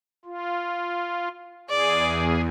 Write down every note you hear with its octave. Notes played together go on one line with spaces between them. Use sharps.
F4
E2 G#4 D5